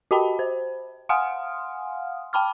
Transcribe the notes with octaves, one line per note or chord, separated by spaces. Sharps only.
F#4 G4 D#5 G5 A5 B5
C5
F5 F#5 G#5 C6 D#6 F6
G5 A5 B5 D6 F6